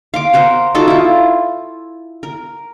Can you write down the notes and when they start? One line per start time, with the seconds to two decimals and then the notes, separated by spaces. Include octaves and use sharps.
0.14 F5 C6 D6
0.33 A#4 C5 F#5 A#5
0.75 D#4 F4 F#4 A4
0.88 E4 F4
2.23 A#4